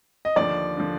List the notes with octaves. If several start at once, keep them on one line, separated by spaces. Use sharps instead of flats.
D#5
D#2 D3 F3 D5
D3 F3